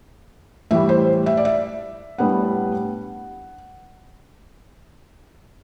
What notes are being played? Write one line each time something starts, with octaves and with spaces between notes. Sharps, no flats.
A2 E3 G3 E5
C5
E5
D5
E5
A2 G3 B3 D4 F#5